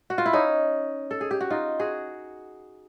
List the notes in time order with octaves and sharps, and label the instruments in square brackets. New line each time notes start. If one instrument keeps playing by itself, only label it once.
[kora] F#4
F4
E4
C#4 D#4
A4
G#4
G4
F#4
D#4 F4
F#4 G#4